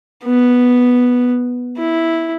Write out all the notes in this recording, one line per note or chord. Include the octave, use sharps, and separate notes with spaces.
B3
E4